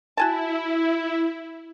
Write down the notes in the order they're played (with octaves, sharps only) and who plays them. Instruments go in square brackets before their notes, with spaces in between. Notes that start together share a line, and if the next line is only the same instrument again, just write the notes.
[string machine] E4 [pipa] F#4 G#5 A5